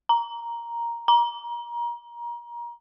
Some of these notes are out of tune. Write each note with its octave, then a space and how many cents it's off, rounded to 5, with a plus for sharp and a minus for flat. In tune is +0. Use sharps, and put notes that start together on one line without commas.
A#5 +5
A#5 +30